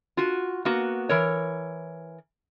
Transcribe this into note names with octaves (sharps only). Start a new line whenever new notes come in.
F4 F#4
A#3 B3 F#4
E3 A#4 C#5